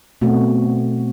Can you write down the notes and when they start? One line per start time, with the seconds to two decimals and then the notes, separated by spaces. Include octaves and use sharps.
0.22 B2 A3 C4 F#4